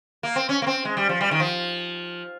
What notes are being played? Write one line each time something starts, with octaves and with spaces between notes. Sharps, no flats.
A#3
C4
C#4
A#3
C4
G#3
G3
F3
G3
D#3
F3